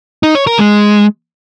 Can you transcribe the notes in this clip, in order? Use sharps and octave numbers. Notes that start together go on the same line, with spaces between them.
D#4
C#5
A#4
G#3